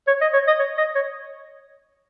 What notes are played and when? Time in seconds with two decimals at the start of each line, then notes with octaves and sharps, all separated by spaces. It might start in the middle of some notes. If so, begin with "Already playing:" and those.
0.08 C#5
0.21 D#5
0.33 C#5
0.48 D#5
0.60 C#5
0.78 D#5
0.95 C#5